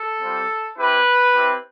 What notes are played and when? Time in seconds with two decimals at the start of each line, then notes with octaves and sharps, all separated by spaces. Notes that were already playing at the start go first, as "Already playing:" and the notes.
Already playing: A4
0.21 G3 C4 F4
0.77 C4 E4 G4 B4
1.35 C4 E4 G4